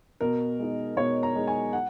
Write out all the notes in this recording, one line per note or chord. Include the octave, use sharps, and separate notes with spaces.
B2 A#4
G#3 D#4
B2 C#5
A#5
G#3 D#4
G#5
F#5